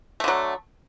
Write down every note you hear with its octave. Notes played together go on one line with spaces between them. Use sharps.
D3 F#3 A3